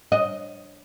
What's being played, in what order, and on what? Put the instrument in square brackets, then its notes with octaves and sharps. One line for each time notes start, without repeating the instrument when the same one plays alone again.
[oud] D#5